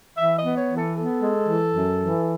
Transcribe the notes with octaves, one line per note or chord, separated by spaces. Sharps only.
E3 E5
D#5
B3
C#5
E3
A4
B3 A4
G#3
E3
F#2
E3